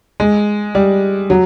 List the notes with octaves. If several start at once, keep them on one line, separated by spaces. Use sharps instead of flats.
G#3
G3
F#3